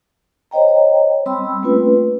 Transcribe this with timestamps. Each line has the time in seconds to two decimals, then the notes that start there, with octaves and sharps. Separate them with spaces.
0.51 C5 C#5 D#5 G5 A#5
1.26 G3 C4 G5 B5 C6 E6
1.63 A3 A#3 C#4 F4 B4